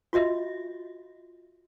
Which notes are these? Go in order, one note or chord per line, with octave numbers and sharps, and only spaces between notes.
F4 F#4 D#5 E5